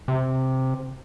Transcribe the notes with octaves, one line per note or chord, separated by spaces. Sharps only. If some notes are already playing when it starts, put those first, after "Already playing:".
C3